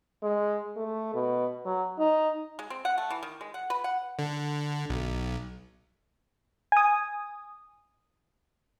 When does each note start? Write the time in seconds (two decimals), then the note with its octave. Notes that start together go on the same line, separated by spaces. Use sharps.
0.23 G#3
0.76 A3
1.14 B2
1.65 F#3
1.99 D#4
2.59 G#3
2.70 C4
2.85 F#5
2.98 A3
3.10 E3
3.23 D#3
3.41 G#3
3.54 F#5
3.70 B4
3.84 F#5
4.19 D3
4.90 B1
6.72 G#5 D#6